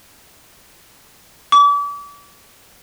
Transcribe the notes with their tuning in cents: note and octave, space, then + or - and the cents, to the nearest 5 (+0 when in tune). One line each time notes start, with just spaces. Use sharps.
D6 -35